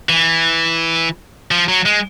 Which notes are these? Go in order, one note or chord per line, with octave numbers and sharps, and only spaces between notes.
E3
F3
F#3
G#3